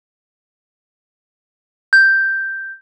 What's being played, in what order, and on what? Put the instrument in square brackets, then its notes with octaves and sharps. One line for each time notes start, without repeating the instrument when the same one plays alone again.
[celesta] G6